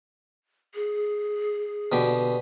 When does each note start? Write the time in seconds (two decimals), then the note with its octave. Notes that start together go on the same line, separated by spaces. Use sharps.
0.75 G#4
1.92 B2 D3 G4